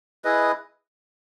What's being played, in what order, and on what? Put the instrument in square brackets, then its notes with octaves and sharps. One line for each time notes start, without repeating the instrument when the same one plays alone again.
[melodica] E4 G#4 B4 D#5